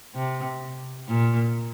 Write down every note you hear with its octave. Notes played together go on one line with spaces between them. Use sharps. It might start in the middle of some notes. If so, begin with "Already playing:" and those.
C3
A#2